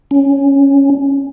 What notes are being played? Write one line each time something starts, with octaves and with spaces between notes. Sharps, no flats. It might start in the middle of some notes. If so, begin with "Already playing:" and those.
C#4